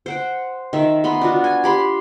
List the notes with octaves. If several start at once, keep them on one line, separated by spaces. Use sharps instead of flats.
C5 F#5 G5
D#3 E5
B3 B5 C6
D4 F4 F#4
G#5
G4 B5 C6